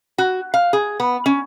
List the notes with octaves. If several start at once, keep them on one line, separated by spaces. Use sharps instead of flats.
F#4
F5
G#4
B3
C#4